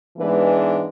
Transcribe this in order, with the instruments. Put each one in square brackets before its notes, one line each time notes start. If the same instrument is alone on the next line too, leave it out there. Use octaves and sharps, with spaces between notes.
[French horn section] G#2 E3 G#3 B3 D4 B4